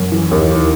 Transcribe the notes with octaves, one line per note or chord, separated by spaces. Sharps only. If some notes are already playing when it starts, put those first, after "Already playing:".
Already playing: F#2
E3
D#2
D#3